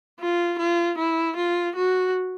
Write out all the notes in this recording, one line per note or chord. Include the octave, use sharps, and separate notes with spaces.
F4
F4
E4
F4
F#4